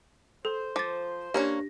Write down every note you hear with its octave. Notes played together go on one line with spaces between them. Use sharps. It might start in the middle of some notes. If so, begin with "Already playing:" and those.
A4 C5
F3 D6 A6
A#3 C#4 D4 G4 C#5 A#6